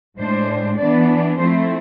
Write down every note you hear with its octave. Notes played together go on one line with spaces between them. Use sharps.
A2 G#3 D4 C5
E3 B3 D4 D5
F3 A3 C4 E4 C5